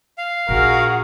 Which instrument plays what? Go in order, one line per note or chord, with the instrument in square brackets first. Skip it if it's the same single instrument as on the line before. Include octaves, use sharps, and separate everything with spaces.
[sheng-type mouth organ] F5
[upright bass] A#1 [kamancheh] F#4 G#4 [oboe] A#4